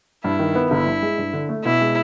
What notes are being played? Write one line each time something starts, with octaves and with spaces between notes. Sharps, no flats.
G2 E4
D#3
B3
G1 E4
G2
G#3
G2
D3
A3
B2 E4
G#3